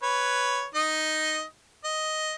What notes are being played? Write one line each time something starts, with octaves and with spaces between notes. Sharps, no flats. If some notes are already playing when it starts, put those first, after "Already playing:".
B4 C#5
D#4 D#5
D#5